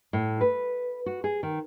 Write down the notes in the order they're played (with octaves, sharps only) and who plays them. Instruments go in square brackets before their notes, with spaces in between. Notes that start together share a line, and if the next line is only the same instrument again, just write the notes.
[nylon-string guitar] A2
B4
F#4
G#4
D#3